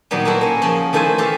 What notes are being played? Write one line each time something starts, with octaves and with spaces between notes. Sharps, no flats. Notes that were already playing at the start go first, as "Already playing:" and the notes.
A#2 D#3 F#3 G3 B3
A#3 E4 F#4 A4
A#3 C#4
C#3 F3
D#3 E3 A3 A4 C5 G#5
A3 C#4 G4 A4 F5